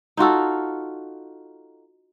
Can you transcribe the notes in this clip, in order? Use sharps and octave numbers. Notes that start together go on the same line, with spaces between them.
D#4 F4 F#4 A4